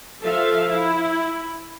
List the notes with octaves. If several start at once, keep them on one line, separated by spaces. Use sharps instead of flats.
F3 A4 E5 F5
E4